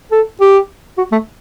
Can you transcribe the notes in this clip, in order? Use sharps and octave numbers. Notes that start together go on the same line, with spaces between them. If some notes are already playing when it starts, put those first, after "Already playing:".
A4
G4
F#4
A3